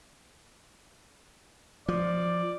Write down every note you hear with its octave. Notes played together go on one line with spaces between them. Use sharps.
F3 D5